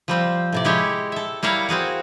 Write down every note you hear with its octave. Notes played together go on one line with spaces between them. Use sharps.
F3 G3 C4
A2 C3 D5
G#3 E4 G4 C#5
A4 E5
G3 E4 A#4 C#5 F5
C4 F#4 G#4 F5